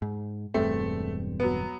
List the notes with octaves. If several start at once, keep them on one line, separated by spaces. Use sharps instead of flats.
G#2
E1 G2 A3 C4
F#3 B3